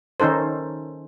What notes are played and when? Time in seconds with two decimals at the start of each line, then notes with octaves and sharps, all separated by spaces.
0.20 D#3 C#4 D#4 A4 C5